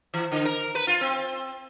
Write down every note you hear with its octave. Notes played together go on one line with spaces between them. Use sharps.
E3
D3
A#4
B4
F4
C4